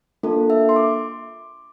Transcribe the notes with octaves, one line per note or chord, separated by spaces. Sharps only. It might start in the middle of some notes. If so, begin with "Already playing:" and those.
A#3 D4 F4 A4
E5
C6
D6